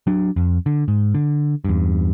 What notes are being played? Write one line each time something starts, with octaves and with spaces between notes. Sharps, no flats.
F#3 D4
F2
D3
G#2
D3
E2 G2